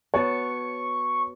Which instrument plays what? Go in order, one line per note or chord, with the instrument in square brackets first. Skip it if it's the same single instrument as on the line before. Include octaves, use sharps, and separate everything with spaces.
[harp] B3 F#4 A5 [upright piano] C#5 [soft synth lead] C#6